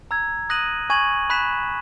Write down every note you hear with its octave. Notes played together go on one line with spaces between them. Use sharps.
A#5 E6 G#6
D#6 F#6 A#6 D#7 F#7
G#5 C#6 G#6 D#7 F#7
B5 F#6 B6 E7